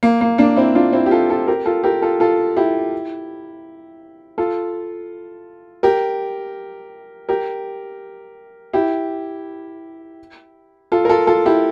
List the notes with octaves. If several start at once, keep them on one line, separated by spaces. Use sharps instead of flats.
A#3
A#3
A#3 D4
C4 E4
D4 F4
C4 E4
G4
F4 A4
F4 A4
G4 A#4
F4 A4
G4 A#4
F4 A4
F4 A4
E4 G4
F4 A4
G4 A#4
G4 A#4
E4 G4
F4 A4
A#4
F4 A4
F4 A4
E4 G4